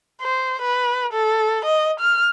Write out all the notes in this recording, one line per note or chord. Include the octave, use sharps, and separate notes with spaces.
C5
B4
A4
D#5
F6